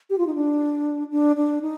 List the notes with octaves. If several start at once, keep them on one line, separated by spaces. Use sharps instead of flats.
G4
F4
D#4
D4
D4
D4
D#4